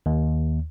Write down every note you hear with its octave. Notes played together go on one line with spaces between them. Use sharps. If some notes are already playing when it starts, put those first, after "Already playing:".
D#2